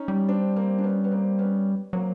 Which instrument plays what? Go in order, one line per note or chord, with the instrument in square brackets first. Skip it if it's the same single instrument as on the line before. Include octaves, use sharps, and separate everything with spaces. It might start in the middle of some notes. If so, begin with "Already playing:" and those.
Already playing: [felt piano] C#4 D#4
[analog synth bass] G3
[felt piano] C4 D4
A#3 C4
D4
B3 C#4
B3
A#3 C4
B3 C#4
[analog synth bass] F#3 [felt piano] A#3 C4